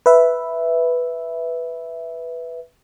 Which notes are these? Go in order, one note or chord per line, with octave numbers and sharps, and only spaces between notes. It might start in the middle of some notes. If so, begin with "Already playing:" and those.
B4 E5